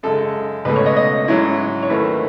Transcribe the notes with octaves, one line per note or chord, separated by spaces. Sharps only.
F#2 C#3 G#3 A4
C#2 B2 A3 B4
C#5
D#5
D#5
G#2 F#3 C#4 E4
C#5
D#2 D#3 A3 E4 B4